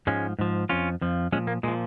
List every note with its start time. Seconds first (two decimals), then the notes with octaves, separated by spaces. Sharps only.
0.07 G#2 F3 G#3 C#4
0.39 G#2 F3
0.69 F2 F3 C#4 F4
1.01 F2 F3
1.32 A#2 F3 G#3 C#4
1.47 A#3
1.63 A#2 G#3
1.68 F3